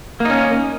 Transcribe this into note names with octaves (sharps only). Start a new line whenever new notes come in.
A#3 C#4 D#4